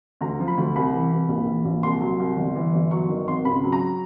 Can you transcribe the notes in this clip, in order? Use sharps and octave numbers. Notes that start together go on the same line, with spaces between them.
D2 A#5
F3
B5
D2
C2 B5
E3
C2
A#1
E3
A#1
C2 C6
F#3
C2
G1
E3
G1
F#3 C#6
D#3
G#1 C6
C#2 B5
F#3
A#5